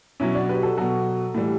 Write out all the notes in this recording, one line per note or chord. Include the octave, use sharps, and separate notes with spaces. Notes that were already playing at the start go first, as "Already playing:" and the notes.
B2 F#3 C#4 E4
D4 F#4
G4 B4
F#4 A4
B2 F#3 F#4 A4
A2 E3 G3